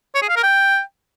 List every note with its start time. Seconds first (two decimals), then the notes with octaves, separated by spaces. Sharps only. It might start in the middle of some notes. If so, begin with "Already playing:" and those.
0.15 C#5
0.22 G#4
0.29 F5
0.36 A#4
0.43 G5